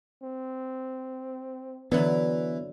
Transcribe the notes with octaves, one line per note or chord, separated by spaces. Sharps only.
C4
D3 E3 F#3 B3